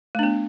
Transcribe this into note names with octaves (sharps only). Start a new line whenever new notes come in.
A3 B3 D4